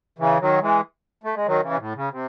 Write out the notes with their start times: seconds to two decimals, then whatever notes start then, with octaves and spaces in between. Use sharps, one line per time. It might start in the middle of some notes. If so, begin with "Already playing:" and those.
0.19 C#3 E3
0.40 D#3 F#3
0.62 E3 G#3
1.24 A3
1.35 G#3
1.46 D#3 F#3
1.63 C#3 E3
1.74 C3
1.79 A2
1.95 C#3
2.11 C3